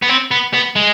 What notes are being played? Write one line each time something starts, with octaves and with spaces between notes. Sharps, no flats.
B3
C4
B3
B3
G#3